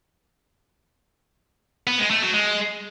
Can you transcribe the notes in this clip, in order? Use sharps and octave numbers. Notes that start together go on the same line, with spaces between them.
B3
G#3
A3
F#3
G#3